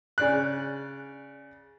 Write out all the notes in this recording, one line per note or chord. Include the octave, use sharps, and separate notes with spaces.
C#3 D5 F#6